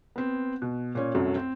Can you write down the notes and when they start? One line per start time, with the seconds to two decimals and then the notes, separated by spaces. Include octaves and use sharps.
0.16 B3 C4
0.62 B2
0.95 A#2 C#4
1.15 C2 F#2 F#3 A3
1.36 C4